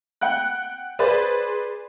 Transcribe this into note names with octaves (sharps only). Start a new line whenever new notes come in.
F#5 G5 F#6
G#4 B4 C5 D5